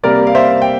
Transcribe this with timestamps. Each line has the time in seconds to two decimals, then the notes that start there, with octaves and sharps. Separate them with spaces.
0.03 C3 G3 A#3 A#4 D5
0.27 F5
0.35 C5 E5
0.62 G5